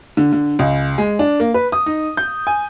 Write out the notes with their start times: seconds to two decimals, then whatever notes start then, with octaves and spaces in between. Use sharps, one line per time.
0.17 D3
0.33 D3
0.59 C#2
0.98 G#3
1.19 D4
1.40 A#3
1.54 B4
1.72 D#6
1.86 D#4
2.17 G6
2.47 G#5